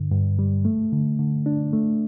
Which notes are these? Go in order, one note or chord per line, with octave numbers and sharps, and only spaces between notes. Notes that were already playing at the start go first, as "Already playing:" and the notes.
Already playing: G2 D3
G2
G3
A3
D3
D3
D4
A3